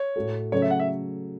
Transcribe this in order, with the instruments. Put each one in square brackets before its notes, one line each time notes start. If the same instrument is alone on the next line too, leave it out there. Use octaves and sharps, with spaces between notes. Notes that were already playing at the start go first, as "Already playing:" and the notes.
Already playing: [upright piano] C#5
[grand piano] A2 A3 F#4 A4
[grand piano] C#3 F#3 A3 F#4 A4 [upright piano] C#5
[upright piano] E5
F#5
E5